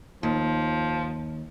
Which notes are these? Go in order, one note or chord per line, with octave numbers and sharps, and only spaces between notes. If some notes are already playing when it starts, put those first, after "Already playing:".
D#2 F3